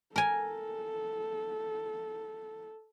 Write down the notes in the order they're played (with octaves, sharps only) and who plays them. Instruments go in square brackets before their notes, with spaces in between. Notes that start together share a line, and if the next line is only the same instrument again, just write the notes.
[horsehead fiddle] A4 [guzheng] A#4 G#5